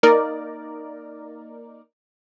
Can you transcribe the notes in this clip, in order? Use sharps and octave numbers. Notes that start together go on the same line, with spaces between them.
A#3 D#4 A#4 D5